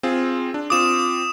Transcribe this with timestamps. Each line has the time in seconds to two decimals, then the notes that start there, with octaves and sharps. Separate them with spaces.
0.03 C4 F4 G#4
0.54 D4
0.70 C4 F4 D6 D#6 E7